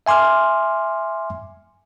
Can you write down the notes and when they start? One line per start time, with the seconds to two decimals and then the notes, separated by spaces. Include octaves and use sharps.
0.06 E5 G#5 C6 D6 F6